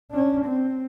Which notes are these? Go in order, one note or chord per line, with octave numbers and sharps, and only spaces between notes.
C#4 D4
C4